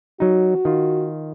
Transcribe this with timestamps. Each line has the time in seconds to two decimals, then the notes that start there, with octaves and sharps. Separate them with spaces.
0.20 F#3 D#4 F#4
0.65 D#3 F4